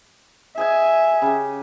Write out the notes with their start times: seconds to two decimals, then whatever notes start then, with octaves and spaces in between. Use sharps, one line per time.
0.58 G#4 D#5 E5 G#5
1.22 C#3 G4